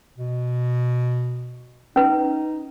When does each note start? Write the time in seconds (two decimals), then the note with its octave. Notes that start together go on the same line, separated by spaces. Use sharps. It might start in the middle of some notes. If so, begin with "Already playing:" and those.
0.18 B2
1.96 C#4 D#4 B4